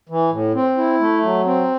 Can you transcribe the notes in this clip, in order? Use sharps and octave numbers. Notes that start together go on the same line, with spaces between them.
E3
A2
C4
E4
A3
F#3
C4